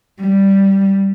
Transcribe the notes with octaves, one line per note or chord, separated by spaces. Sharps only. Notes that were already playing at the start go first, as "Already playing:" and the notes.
G3